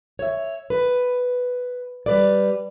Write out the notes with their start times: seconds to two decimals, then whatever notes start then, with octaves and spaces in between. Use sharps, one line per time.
0.19 C#5 E5
0.70 B4
2.06 G3 B4 D5